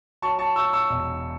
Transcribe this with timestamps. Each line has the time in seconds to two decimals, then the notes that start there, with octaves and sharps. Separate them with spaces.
0.22 F#3 A5 C#6
0.39 A5 C#6
0.56 F#3 C#6 E6
0.73 C#6 E6
0.89 E1